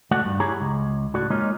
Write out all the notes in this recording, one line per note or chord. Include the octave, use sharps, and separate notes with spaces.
C#2 A3 F#4 D5 F#5
G2
E4 G4 G#4 C#5 A#5
C#2
A2 F#4 D5
G#3 A#3 C#4 D#4 F4